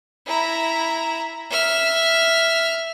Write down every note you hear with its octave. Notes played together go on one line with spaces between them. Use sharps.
E4 A#5
E5 F6